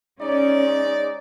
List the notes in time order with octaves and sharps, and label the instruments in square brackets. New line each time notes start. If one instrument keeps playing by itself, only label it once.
[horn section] G#3 D#4 D5 [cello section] C#4